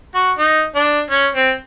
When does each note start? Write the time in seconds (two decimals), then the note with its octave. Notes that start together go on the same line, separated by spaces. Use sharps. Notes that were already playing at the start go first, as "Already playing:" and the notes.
0.15 F#4
0.38 D#4
0.75 D4
1.10 C#4
1.35 C4